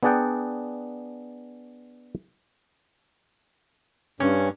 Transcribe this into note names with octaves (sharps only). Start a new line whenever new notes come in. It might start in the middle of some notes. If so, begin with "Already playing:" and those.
B3 D4 G#4 D5 F#5 G5
G2 C#4